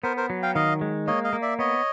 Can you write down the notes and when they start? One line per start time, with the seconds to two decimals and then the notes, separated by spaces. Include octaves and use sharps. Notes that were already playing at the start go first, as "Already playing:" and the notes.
0.04 B3 A#4 C5
0.17 A#4 C5
0.30 F#3
0.43 F5 G5
0.55 D#3 D#5 F5
0.81 G#3
1.07 A#3 C#5 D#5
1.24 D#5 F5
1.33 A#3
1.42 D5 E5
1.59 B3 C#5 D#5